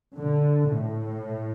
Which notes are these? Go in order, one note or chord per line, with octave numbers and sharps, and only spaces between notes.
D3
A2